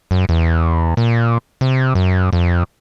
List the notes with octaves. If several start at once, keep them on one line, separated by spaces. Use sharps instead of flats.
F#2
E2
A#2
C3
F#2
F2